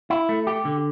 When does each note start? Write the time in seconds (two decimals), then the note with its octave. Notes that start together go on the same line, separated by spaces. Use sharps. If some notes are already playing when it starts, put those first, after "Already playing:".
0.10 E4
0.29 A3
0.47 G4
0.65 D3